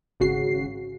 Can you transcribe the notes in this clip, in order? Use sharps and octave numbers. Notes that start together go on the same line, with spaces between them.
G#1 C#3 F#4 C7